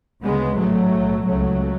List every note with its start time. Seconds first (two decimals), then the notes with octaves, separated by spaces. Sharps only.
0.23 D2 C#3 G#3 B3
0.57 A1 G#2 F#3 A3
0.92 B1 A2
1.27 C#2 C#3 F#3 A3